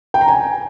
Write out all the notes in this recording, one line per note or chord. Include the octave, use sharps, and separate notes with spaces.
G5
A#5
G#5